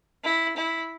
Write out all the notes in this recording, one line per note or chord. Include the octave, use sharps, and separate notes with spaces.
E4
E4